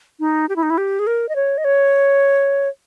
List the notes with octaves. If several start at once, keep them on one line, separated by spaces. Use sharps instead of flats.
D#4
G4
E4
D#4
E4
G4
G#4
A#4
D#5
C#5
D#5
C#5